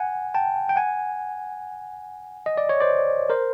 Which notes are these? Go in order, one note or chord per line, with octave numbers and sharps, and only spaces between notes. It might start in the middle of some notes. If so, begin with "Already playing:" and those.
Already playing: F#5 G#5
G5 A5
G5
F#5 G#5
D#5
D5
C#5
C5 D5
A#4 C5